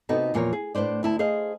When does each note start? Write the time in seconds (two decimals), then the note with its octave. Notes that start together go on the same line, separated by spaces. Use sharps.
0.09 C3 B3 D#4 F#4 A4
0.34 E2 A#2 F3 A#4 C#5
0.53 G#4
0.75 A2 D4 B4 C5 D5
1.03 D2 E4 A5
1.19 G#4 C5 D#5 F5